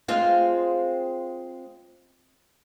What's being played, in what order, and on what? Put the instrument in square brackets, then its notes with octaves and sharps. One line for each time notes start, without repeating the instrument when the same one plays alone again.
[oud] G#3 C4 F4